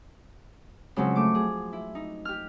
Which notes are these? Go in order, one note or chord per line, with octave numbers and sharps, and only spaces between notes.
C#3 F3 F#3 G#3 C4
A3 D6
G#4
E4
D#4
G4 F6